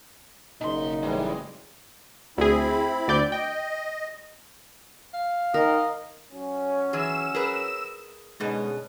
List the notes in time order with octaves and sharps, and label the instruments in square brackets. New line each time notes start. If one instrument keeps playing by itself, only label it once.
[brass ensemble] F#1 [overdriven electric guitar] B2 C6 [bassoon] D#4
[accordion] A2 E3 G3 [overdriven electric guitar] G#3
[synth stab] D2 G#4 [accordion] C4 E4 B5
[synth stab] D2 D5 G6
[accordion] D#5 [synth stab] G5
[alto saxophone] F5
[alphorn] D#3 [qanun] A#4 [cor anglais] D#5
[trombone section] F#3 C#4
[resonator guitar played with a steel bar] E3 G#4 [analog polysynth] E6 E7
[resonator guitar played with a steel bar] G#4 A#4 B4
[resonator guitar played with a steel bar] G#2 B2 B3 [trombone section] D3 C#4 G#4 [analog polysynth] G#3